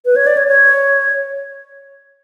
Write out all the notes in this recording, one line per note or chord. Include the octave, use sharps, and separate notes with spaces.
B4
C#5
D5
C#5
C#5